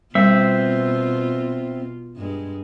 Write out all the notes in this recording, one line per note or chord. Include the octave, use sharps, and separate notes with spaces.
B2 G3 B3 C4 F4 E5
G2 G#3